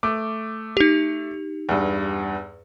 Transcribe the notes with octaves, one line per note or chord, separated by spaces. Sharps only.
A3 D6
D#4 G4
E2 G2